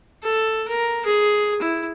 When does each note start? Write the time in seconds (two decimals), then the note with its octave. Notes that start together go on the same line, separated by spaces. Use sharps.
0.23 A4
0.68 A#4
1.05 G#4
1.62 E4